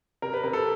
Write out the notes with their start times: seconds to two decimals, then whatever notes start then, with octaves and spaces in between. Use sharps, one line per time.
0.22 C3 A#4
0.34 B4
0.43 C3 A#4
0.53 A4